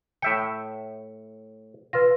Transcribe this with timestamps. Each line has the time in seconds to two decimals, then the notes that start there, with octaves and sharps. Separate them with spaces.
0.22 A2 E5 G5 C#7
1.93 F4 B4 A#6